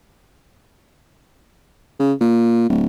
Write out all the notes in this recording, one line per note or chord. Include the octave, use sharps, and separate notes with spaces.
C#3
A#2
D1